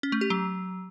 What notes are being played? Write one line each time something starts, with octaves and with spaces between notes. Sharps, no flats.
C#4
A3
G4
F#3